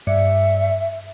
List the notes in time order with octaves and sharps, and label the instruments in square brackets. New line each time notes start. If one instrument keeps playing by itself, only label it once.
[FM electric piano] G2 D5 C#7 [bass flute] E5